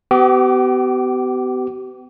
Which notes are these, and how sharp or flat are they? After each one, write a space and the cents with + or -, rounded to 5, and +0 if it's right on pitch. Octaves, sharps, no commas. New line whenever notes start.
B3 +35 G4 -40 D6 +0